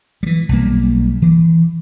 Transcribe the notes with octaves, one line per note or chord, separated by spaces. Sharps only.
E3 G3
B1 G3 A#3
E3